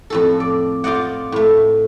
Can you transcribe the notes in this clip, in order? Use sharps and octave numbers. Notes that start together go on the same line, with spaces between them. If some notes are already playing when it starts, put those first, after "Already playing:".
F2 A2 A4
D5
F4 C5 D5 D#5 F#5
A2 A3